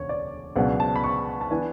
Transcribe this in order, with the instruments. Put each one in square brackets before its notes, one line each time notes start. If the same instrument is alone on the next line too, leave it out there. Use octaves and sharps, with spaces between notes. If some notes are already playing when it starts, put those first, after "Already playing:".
Already playing: [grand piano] E1 D2 C#3 C#5
D5
C#2 B2 F#3 B3 D4 F#5
A5
B5
C#6
A5
E3 B3 D4 G#5